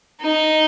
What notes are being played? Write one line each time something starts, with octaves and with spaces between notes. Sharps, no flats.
D#4